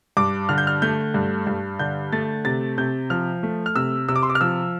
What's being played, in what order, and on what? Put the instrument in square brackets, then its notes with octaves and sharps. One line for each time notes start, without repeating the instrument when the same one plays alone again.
[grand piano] G2 D6
D3 F6
G6
F6
A3 G6
G2
G2
D3 G6
A3 A6
C3 A6
C3 G6
F3 F6
A3
F6
C3 E6
C3 E6
D6
C6
D6
F6
F3 E6